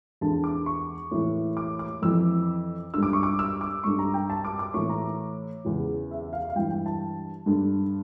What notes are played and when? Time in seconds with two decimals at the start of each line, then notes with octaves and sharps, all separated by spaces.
0.21 E2 D3 A5
0.44 D6
0.66 C#6
1.12 A2 E3
1.57 D6
1.79 D6
2.02 F2 E3 E6
2.94 G2 D3 E6
3.03 D6
3.13 C#6
3.23 D6
3.39 E6
3.61 D6
3.83 G2 D3 C#6
3.99 A#5
4.14 G5
4.30 A5
4.45 D6
4.59 D6
4.74 A2 E3 C#6
4.89 A#5
5.65 E2 C#3 E3
6.11 E5
6.33 F5
6.50 F5
6.55 G2 E3 G5
6.70 G5
6.86 A5
7.46 G2 D3